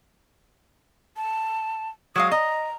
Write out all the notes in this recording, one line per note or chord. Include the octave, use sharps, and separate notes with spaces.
A5
F#3 G#3 F5 D#6
D#5 A#5